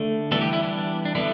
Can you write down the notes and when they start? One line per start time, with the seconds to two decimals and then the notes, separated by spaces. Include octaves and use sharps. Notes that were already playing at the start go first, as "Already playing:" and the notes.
Already playing: D3 A3
0.32 E3 G3 B3 A4
0.41 G4
0.53 E4
0.63 D4
1.05 D4
1.15 D3 G3 B3 E4